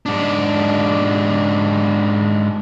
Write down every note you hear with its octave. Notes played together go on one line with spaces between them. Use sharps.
G#2 D4